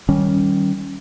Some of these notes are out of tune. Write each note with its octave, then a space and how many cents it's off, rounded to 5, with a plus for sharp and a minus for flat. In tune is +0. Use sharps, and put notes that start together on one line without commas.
D#3 +0 G3 -20 C#4 -5